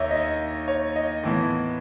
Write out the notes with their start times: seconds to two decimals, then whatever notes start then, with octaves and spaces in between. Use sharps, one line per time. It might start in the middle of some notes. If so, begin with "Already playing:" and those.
Already playing: D#2 C#5 D#5 E5
0.11 D#5
0.68 C#5
0.96 D#5
1.23 A2 E3 B3